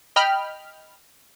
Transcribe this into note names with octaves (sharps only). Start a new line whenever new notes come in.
D#5 G5 B5 F6